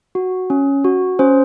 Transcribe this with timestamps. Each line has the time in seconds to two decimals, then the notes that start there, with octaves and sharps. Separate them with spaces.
0.15 F#4
0.50 C#4
0.84 F#4
1.19 C#4 C5